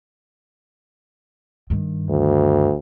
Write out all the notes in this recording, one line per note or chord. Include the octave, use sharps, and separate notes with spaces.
G2 D#3
D2